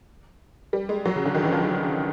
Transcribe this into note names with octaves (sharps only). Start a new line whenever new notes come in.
G3
G#3
F#3
C#3
D3
D#3
E3
F3